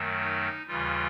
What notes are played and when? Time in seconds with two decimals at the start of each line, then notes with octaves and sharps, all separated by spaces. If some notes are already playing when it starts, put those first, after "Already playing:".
Already playing: F#2 D#3 F#3 A3
0.20 D#4
0.67 D#2 C#3 E3 G3 F4